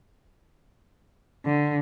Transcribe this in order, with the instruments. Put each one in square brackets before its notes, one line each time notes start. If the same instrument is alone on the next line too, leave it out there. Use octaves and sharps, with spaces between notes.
[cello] D3